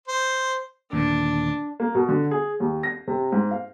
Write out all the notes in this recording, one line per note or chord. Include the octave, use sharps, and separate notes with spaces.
C5
D#2 A#2 D3 D4
A#3
B2
D3
G#4
D#2
A#6
C3
G#2
F5